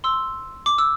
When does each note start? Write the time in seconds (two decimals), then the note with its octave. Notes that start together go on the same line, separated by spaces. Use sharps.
0.04 C6 E6
0.66 D6
0.78 E6